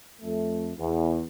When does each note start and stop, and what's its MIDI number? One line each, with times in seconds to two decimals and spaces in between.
0.22 0.71 41
0.22 0.71 57
0.78 1.22 40